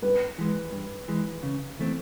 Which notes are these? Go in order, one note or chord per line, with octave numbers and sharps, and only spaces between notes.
G2 B4
E3 G#3
G2
E3 G#3
C#3
E3 A3 C4